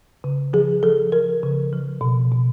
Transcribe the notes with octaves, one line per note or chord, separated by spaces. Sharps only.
C#3
F3 G#4
F3 A4
F3 A#4
C#3
F3
B2
B2